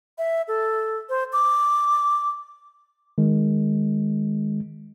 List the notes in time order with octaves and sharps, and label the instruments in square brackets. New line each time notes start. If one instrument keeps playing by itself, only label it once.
[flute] E5
A4
C5
D6
[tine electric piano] D#3 G#3